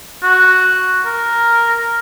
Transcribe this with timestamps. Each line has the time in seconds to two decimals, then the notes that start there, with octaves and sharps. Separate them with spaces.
0.23 F#4
1.06 A#4